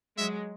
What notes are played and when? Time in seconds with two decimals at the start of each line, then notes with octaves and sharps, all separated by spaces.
0.17 F#3 G#3 E5